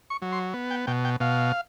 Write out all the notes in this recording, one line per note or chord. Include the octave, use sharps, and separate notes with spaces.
C#6
F#3
C6
B3
G5
B2 G5
G5
B2 F5